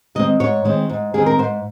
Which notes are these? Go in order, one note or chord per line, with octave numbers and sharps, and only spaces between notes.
D#3 G#3 C4 D#5
G#2 C#5
D#3 G#3 C4
G#2
D#3 G#3 C4 G#4
A#4
G#2 C5